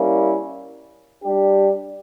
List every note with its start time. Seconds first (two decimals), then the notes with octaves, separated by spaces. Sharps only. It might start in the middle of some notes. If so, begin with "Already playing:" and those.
Already playing: G3 A#3 C#4 E4
1.24 G3 D4 G4